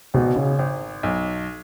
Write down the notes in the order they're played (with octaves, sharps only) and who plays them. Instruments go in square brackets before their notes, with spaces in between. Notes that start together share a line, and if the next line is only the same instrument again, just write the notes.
[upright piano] G#1 [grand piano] B2
[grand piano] C#3
[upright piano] G#1
B1